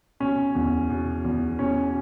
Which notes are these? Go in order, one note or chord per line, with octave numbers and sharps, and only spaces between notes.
B2 C#4
E2
B2
E2
B2 C#4